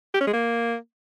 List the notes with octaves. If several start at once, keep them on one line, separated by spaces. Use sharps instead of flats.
G4
C#4
G#3
A#3